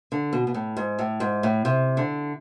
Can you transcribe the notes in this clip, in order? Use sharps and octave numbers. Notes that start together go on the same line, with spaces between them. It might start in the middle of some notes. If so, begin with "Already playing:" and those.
D3
B2
B2
A2
G#2
A2
G#2
A2
C3
D3